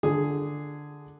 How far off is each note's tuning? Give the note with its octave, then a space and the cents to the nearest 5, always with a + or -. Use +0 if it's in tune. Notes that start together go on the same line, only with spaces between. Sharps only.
D3 +5 G#4 +0